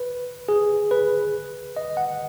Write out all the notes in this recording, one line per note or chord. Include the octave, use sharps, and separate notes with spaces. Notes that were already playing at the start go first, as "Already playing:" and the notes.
Already playing: B4
G#4
B4
D#5
F#5